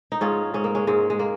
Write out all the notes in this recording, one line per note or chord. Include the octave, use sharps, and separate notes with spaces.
D#4
G#2 C#4 F4
G#2 C#4
A#3
G#3 C#4
G#2 G#3
G#3
A#3